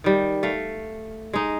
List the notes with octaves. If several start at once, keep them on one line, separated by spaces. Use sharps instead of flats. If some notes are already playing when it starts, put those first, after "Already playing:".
D#3 G3
A3 F5
G#3 D#4